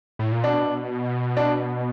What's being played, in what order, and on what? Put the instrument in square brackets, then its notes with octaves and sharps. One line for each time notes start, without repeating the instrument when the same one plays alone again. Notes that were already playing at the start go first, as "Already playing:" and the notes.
[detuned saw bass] A2
A#2
[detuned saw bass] B2 [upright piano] D4
[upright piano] D4